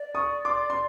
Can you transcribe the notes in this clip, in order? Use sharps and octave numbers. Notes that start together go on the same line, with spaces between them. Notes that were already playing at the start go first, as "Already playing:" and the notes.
Already playing: D5
C#6 D#6
C6 D6
C6